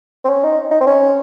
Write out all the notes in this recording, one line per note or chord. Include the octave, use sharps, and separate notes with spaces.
C4
C#4
D#4
D#4
C4
C#4